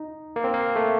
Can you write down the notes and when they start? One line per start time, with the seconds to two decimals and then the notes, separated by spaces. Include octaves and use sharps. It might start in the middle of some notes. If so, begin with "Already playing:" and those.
Already playing: D#4
0.36 A#3
0.44 C4
0.53 A#3
0.76 A3